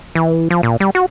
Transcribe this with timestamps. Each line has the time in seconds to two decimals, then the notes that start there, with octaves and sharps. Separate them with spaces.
0.15 E3
0.50 F3
0.63 A#2
0.80 G3
0.95 F#4